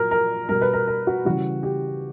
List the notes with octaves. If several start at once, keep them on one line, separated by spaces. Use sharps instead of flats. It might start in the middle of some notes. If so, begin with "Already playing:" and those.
Already playing: A#2 F#3 A#4
A#4
B2 G3 A#4
B4
A#4
A#4
F#4
C#3 E3 G3 F#4
G4